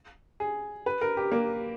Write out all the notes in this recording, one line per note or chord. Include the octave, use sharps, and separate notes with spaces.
G#4
B4
A#4
G4
A#3